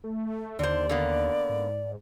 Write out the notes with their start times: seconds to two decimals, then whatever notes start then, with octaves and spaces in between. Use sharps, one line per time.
0.04 A3
0.59 D#2 D3 C5 D5
0.89 D3 A#3 B3
1.50 G#2